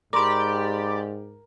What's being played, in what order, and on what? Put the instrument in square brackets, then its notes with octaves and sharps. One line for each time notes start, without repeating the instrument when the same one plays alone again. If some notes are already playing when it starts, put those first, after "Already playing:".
[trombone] G#2 [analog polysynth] G4 D5 [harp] A#4 [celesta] B5 C6 D6